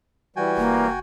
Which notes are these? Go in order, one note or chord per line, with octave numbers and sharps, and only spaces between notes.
E3 G3 F#4 G5 G#5
F1 A#3